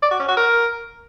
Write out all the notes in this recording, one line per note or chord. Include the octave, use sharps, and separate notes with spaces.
D5
F#4
C#4
F#4
A#4